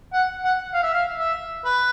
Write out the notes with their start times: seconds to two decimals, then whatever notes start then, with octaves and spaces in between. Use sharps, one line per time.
0.13 F#5
0.44 F#5
0.74 F5
0.83 E5
0.94 F5
1.19 E5
1.65 B4